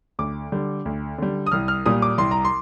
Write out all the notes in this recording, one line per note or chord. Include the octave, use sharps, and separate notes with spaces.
D2 D6
D3 G3
D2
D3 G3
D#6
C2 F6
F6
A#2 G3 D#6
D6
C2 C6
A#5
C6